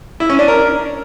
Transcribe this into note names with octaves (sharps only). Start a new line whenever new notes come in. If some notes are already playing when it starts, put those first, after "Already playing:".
E4
C#4
D4
A#4